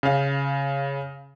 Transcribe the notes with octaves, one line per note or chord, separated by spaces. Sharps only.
C#3 F5